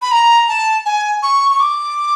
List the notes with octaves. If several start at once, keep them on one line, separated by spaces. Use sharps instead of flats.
B5
A#5
A5
G#5
C#6
C#6
D6